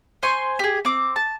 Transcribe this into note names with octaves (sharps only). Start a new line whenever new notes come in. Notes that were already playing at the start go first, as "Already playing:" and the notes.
C5 G#5 C6 C#6
G4 G#4
C4 D6
A5